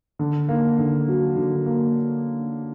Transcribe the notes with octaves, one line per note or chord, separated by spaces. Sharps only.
D3
A#3
D3
F#3
D3
A#3